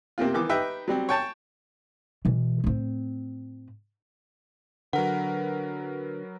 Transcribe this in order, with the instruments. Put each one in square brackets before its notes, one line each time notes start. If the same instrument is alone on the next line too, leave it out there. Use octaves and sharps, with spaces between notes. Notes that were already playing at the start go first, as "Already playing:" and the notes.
[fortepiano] C3 A#3 C4 F4
D#3 E3 D6
D#4 G4 B4 E5 G5
F#3 G3 C4
C#5 G5 A5
[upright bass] B2 E3
A2 C4
[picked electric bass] D3 [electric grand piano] F#3 A#4 B4 [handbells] F#5